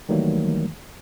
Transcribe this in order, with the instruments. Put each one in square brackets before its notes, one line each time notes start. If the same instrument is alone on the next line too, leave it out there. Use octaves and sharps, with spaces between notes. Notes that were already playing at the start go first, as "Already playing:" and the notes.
[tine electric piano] D#3 E3 F#3 G3 A3 A#3